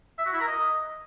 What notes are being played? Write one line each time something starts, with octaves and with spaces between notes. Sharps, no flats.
E5
F#4
E4
A#4
D#5